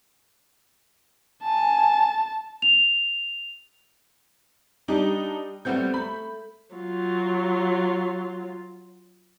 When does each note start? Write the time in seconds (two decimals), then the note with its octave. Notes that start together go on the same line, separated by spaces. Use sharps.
1.43 G#5 A5
2.62 F7
4.88 G3 D4 D#4 G4
5.65 G3 A3 B3 C4 F#4 G6
5.94 A3 B5
6.75 F#3 F4